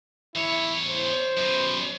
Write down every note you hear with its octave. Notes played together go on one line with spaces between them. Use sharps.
E2 E4 C#5
C5
F#2 B2